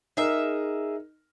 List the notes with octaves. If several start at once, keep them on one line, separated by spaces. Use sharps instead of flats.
D#4 G#4 A#4 E5